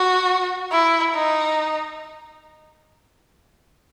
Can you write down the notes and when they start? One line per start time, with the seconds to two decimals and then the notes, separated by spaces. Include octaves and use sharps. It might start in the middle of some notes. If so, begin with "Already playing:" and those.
Already playing: F#4
0.72 E4
1.15 D#4